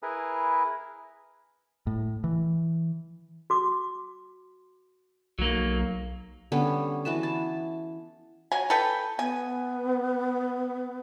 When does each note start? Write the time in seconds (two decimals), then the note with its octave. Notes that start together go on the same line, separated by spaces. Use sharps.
0.03 E4 G#4 A#4 B4
1.87 A2
2.24 E3
3.50 F#4 D6
5.39 B1 F#3 A#3
6.52 D3 G3 B3 C#4
7.05 E3 F#4 B4 A5
7.23 A5
8.52 F#3 G#5
8.70 A4 B4 G5
9.19 B3 G#5